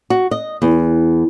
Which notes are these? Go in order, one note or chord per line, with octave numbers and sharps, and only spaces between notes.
F#4
D#5
E2